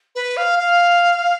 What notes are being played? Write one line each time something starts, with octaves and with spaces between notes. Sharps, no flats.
B4
F5
F5